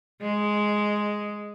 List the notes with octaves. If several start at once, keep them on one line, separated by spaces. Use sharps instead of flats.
G#3